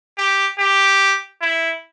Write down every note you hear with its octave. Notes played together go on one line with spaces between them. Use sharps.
G4
G4
E4